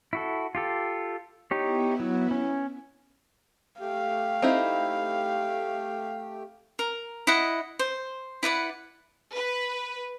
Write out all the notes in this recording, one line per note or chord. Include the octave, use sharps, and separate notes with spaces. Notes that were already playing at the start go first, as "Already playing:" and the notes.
E4 F#4 A4
F4 G4 A4
B3 D#4 E4 G4 C#5
F#3
C#4
A3 G4 F5 G5
C4 D#4 E4
A#4
E4 D#5 F#5
C5
E4 B4 D5 F#5
B4